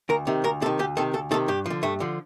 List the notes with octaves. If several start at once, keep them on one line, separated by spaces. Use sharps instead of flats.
D2 A#4
C3 D#3
D2 A#4
C3 D#3 A4
D2 G4
C3 D#3 A4
D2 A4
C3 D#3 A4
G2 G4
D3 F3
G2 A3
D3 F3